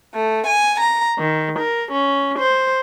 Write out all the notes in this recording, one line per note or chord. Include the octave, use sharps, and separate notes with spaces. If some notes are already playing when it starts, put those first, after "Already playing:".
A3
G#5
A#5
D#3
A#4
C#4
C5